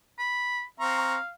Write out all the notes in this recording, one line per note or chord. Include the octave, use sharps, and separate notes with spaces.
B5
C4 F5 A#5 C#6